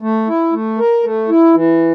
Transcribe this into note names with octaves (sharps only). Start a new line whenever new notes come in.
A3
E4
A3
A#4
A3
E4
E3